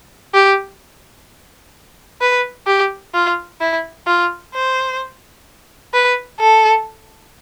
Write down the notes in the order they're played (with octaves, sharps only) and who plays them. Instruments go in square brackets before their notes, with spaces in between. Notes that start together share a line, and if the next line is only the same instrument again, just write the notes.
[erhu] G4
B4
G4
F4
E4
F4
C5
B4
A4